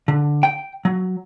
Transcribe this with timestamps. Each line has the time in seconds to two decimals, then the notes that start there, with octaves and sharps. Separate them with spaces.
0.08 D3
0.43 G5
0.85 F#3